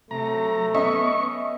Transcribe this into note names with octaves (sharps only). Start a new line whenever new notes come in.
C3 F#3 A3 A#5
B3 C#4 D#5 E5 C#6